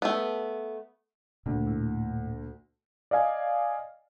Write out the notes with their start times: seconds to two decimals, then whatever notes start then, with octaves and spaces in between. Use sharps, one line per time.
0.02 A3 B3
1.46 D2 A#2
1.66 A2
3.11 D5 D#5 F5 G#5